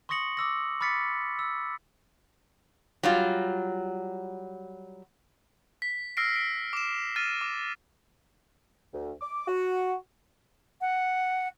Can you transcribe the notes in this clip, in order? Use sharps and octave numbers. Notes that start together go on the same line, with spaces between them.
C6 C#6 D#6 A#6 C#7 F#7
D6 E6 A#6
B5 D6 F6 A6 B6 C#7
E6
F#3 G3 F4
B6
E6 F6 A#6 C7 D7
D7
D6 E7
F6 A6 D#7
D6
D2
D6
F#4
F#5